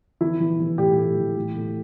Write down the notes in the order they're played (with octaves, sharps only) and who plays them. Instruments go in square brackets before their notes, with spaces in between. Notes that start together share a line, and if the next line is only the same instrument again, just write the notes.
[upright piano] E3 E4
E3
E3
A2 G4
A2
E3
A2
A2